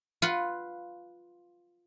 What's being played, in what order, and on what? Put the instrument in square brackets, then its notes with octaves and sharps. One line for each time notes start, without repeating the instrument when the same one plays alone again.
[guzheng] F4 B4 F#5